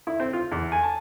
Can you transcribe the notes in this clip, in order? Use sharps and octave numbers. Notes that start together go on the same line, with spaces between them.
E4
C4
F4
E2
G#5
A5